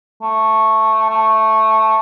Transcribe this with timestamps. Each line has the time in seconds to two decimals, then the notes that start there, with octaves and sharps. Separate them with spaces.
0.22 A3
1.09 A3